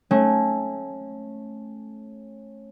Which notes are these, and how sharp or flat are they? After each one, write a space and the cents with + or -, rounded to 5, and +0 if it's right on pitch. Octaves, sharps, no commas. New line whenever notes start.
A3 -15 C#4 -25